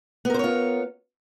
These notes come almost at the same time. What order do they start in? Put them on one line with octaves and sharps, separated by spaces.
B3 A#4 C5 C#5 F4